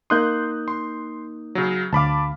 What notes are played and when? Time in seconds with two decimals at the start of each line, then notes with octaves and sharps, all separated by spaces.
0.10 A#3 D#4 C6 D#6 F#6 G6
0.68 C6
1.55 C#3 F#3
1.93 D2 F5 A5 B5 D6